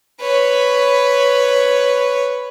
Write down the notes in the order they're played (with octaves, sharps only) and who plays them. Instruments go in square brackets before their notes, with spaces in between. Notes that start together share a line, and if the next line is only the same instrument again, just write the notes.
[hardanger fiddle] B4 C#5